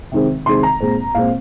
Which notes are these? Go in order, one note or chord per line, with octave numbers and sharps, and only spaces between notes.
C3 D#3 G#3 C4
C3 D#3 G#3 C4 C6
A#5
A#2 G#3 C4
A#2 G#3 C4 F5